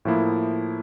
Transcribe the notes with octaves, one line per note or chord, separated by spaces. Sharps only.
A2 F3 A#3 E4